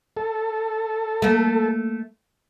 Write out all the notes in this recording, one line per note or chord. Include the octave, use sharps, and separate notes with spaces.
A4
A3 A#3